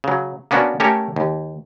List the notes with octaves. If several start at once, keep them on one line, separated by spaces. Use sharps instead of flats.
C#3 F#3
A#3 B3 C#4 D4 F#4
A3 C#4 G4 A4 A#4 C#5
D#2